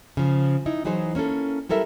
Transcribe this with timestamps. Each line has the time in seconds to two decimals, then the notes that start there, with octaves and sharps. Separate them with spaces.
0.17 C#3 F3
0.66 D#4 E4
0.85 E3 F#3 D#4 G#4 C5
1.15 A#3 C#4 E4 A4
1.69 G3 E4 A4 A#4 E5